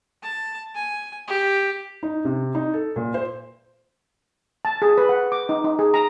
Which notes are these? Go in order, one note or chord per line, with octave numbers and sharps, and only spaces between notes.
A5
G#5
G4
D#4
C3
D#4
A4
A#2
C5
A5
G#4
B4
F#5
D6
D#4
D#4
G#4
A#5